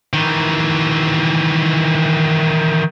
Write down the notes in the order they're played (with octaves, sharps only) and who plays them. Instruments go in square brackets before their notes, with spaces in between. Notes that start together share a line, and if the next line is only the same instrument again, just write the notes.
[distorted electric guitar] D#3 E3